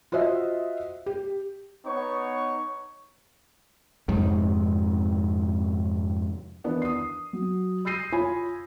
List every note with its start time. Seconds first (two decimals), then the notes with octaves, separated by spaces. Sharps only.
0.12 F4 F#4 C5 D#5 E5
1.06 G4
1.84 B3 D#4 C#5 C#6
4.08 F2 G#2 C3 D#3
6.64 D#3 E3 B3 D4
6.82 D#6 C7
7.33 F#3
7.85 D#6 E6 G6 A#6 C7 D#7
8.13 F4 C#5 G#5 B5